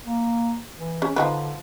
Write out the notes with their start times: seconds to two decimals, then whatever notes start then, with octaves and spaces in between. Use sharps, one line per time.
0.06 A#3
0.78 E3
1.02 C#4 G#4
1.16 D3 F3 D#4 B4